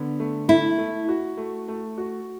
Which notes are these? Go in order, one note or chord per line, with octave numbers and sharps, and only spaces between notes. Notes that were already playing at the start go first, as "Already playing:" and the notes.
Already playing: D3 B3
A3
A3 E4
A3
F#4
A3
A3
F#4